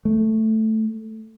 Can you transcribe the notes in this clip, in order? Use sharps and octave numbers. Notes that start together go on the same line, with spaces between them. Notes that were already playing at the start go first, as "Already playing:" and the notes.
A3